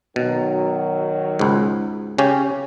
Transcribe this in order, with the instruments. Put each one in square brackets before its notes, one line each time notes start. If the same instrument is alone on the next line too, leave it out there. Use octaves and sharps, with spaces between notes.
[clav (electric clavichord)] B2 [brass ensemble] D#3 F#3
[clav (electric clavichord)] C#2 G#2
C#3 C#4 G4